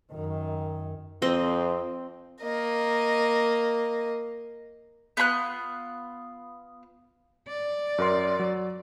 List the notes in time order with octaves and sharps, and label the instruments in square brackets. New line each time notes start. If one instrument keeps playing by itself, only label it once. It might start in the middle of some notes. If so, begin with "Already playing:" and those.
[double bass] F#2 D#3
[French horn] F2 [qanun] C4 D#5
[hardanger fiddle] A#3 D#5
[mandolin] B3 F4 B5 F#6
[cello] D5
[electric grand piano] F#2 A#4 C6
F#3